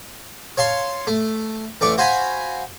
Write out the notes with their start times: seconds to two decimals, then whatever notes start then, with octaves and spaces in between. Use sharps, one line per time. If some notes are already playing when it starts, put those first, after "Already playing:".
0.57 C#5 F5 A5 C6
1.07 A3
1.81 A1 A3 D5 C#6
1.98 F#4 C5 F5 G#5 B5